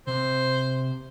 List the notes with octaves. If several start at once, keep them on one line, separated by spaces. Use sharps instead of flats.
C3 C5